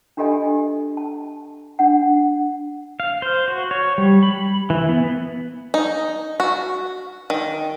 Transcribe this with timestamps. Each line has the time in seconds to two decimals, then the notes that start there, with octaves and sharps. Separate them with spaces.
0.17 D4 F4 G4 A4 D#5 G#5
0.97 A5
1.79 D4 F#5
3.00 F5
3.22 C5
3.48 F#4
3.71 C#5
3.98 G3
4.23 B5
4.70 E3
4.89 B3
5.74 D#4
6.40 F#4
7.30 D#3